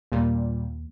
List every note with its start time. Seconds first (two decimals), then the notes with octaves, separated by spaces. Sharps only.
0.12 D#2 A#2 G3